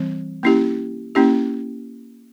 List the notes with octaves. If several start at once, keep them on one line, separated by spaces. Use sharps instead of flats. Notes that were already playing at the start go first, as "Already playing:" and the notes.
Already playing: E3 G3 C4
A#3 C#4 E4 G4
A#3 C#4 E4 G4